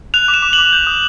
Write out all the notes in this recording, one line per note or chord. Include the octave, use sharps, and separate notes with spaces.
F#6 F7
D6
E7
D6
F#7
D6
G6
D#6